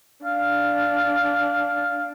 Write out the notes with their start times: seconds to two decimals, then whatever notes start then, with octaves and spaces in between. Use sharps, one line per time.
0.25 D4 F5